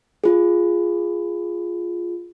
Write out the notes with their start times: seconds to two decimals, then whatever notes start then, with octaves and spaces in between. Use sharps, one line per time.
0.24 F4 G#4